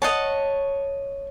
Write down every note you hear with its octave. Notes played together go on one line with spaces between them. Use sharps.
C#5 D#5 F#5 A5